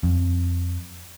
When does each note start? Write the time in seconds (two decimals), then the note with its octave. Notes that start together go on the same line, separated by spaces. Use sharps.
0.03 F2